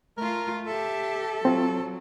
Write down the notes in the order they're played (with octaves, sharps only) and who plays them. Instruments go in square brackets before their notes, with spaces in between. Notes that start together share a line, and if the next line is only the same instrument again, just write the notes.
[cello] A3 F4 [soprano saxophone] A#4
[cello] G4 E5 [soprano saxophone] A4
[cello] F#3 [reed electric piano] C4 F4